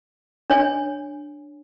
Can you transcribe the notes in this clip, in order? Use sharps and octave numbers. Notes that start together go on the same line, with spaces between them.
D4 C#5 G#5